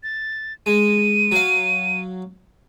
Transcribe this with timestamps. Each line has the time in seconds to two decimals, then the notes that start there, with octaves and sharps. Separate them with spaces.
0.03 A6
0.66 G#3 D#7
1.32 F#3 F5